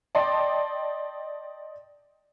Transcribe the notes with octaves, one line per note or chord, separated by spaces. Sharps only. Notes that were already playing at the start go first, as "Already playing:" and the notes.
D5 D#5 G5 A5 C6